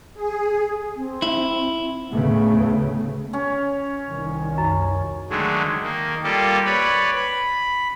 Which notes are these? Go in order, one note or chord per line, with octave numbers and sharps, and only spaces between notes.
G#4
C4
E4
D2 A2 C#3 A3 B3
C#4
C2 D#3
F#2
D3 D#3 F#3 G#3 A3
D#3 A#3
G3 A#3 F4 G4 A4
B4 C#5 D5 B5
B5